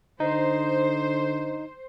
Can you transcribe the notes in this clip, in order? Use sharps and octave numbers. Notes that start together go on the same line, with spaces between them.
D3 D#4 C5